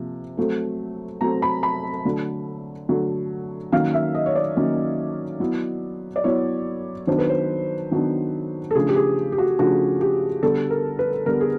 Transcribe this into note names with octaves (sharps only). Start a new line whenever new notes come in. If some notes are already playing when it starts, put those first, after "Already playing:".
Already playing: C3 F3 A#3
F#3 A3 C4
F#3 A3 C4 A#5
B5
B5
D3 F#3 A3
D3 F#3 A3
D#3 F#3 A#3 C#4 F5
E5
D#5
C#5
D5
D#3 F#3 A#3 C#4
F#3 B3 E4
D5
F#3 B3 E4 C#5
D#3 F#3 B3 D4 C5
B4
C5
D#3 F#3 B3 D4
A4
C#3 F3 A3 D4 G#4
G4
G#4
G4
F#4
C#3 F3 A3 D4 F#4
G4
D3 G3 B3 A4
A#4
B4
D3 G3 B3 A#4
G#4